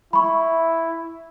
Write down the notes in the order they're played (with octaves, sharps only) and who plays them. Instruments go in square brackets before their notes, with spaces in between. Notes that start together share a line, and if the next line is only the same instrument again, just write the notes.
[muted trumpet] E4 [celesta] B5 C#6